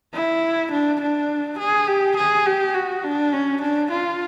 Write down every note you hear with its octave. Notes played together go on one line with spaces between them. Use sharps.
E4
D4
D4
G#4
G4
G#4
G4
F#4
D4
C#4
D4
F4